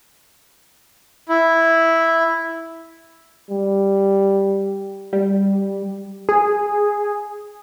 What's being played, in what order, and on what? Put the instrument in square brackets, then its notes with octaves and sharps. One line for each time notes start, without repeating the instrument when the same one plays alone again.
[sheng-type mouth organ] E4
[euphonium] G3
[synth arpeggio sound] G3
G#4